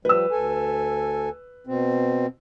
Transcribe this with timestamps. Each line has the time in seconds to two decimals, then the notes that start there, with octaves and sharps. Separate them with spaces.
0.05 F3 G3 B4 E6
0.31 D2 A4 G#5
1.67 B2 C4